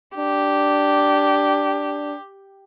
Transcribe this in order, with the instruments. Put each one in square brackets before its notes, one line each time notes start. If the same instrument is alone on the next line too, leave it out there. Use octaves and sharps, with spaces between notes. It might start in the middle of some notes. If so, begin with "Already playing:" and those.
[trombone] D4 [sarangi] G4